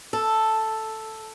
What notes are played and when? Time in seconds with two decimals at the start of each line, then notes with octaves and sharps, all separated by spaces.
0.13 A4